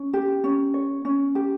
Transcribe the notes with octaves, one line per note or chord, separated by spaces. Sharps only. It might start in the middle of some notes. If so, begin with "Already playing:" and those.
Already playing: C#4
G4
C#4
C#5
C#4
G4